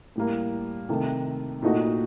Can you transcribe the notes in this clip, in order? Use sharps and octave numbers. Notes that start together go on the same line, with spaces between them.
A2 G3 A#3
C3 D#3 A3
A#2 A3 D#4 F#4